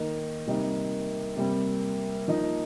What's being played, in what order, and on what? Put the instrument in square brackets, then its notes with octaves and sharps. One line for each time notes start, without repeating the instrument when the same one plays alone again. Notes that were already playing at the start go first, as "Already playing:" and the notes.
Already playing: [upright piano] D#3 A#3 D#4
C3 G3 A#3 D#4
C3 G3 A#3
F3 A#3 D#4